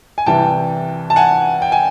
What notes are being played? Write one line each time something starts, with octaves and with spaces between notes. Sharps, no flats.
G#5
C2 C3 E3 G3 G5 A5
A5
F#5 G#5
G5
G#5